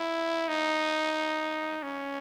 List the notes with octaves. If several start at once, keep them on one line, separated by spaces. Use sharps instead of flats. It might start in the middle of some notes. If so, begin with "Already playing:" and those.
Already playing: E4
D#4
C#4